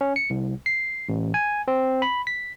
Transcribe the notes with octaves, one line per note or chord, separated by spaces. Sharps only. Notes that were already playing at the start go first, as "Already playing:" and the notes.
C#4
C#7
C2
C7
A1
G#5
C4
B5
B6